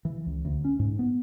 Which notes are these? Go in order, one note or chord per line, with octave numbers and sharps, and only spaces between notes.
E3
C#2
D2
C#4
G#2
B3